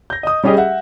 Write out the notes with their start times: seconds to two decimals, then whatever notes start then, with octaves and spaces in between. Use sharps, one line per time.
0.10 G6 A#6
0.23 D#5 D#6
0.43 G3 C#4 G4 G#4 D#5
0.57 E5 F#5